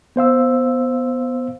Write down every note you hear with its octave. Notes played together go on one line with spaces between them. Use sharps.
B3 C5 F5 E6